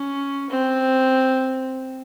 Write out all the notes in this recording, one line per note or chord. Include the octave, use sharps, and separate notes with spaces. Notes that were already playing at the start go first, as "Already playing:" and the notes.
Already playing: C#4
C4